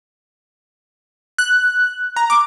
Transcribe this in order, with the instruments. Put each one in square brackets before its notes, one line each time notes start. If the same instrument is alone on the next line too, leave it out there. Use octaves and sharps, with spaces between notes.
[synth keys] F#6
A#5
D6